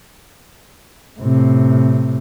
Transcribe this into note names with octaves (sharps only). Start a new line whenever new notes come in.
A2 C3